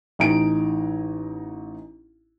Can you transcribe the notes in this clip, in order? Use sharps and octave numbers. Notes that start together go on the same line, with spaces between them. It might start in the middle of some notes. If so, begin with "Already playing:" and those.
A1 D#4 G#5 A#5 D7